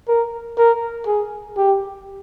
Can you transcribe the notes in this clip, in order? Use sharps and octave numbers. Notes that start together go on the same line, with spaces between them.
A#4
A#4
G#4
G4